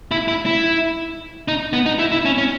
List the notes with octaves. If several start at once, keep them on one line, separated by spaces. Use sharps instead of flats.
E4
E4
E4
D#4
B3
D#4
E4
E4
C#4
C#4